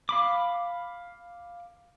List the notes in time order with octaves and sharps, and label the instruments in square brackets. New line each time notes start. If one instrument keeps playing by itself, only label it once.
[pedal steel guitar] F5 B5 D6